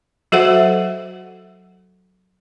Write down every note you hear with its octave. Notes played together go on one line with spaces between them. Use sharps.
F#3 F#4 A4 C5 E5 F#5